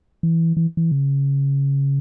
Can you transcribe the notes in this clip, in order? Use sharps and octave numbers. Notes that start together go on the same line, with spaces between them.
E3
E3
E3
C#3